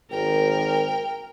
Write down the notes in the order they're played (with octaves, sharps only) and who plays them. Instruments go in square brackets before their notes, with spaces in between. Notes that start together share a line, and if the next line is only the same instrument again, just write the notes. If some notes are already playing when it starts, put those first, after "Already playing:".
[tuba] G#1 [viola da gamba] A#4 [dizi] G5